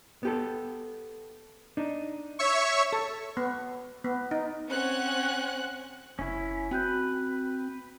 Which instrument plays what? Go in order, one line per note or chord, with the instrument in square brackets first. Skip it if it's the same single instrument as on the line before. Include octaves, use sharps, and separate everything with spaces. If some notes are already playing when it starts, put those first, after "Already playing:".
[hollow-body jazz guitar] B3 G4 A4
D4 D#4
[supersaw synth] C#5 E5 C#6
[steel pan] A4
B3
B3
D#4
[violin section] C4 C#4 F#5 F#6
[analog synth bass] F#1 [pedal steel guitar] C#4 E4
[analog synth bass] C4 [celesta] F#4 F#6 G6 [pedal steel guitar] B4